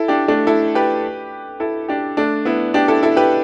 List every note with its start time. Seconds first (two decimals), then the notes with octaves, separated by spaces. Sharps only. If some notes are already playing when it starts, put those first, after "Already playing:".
Already playing: E4 A4
0.08 D4 G4
0.28 A3 D4
0.47 E4 A4
0.75 G4 B4
1.60 E4 A4
1.89 D4 G4
2.17 A3 D4
2.45 B3 E4
2.74 D4 G4
2.88 E4 A4
3.03 E4 A4
3.16 G4 B4